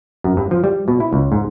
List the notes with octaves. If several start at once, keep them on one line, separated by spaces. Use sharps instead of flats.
F#2
G2
F3
G3
B2
E4
C#2
G#2